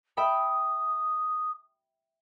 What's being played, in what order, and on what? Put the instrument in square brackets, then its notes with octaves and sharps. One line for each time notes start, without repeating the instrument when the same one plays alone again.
[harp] E5 G5 B5 [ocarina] D#6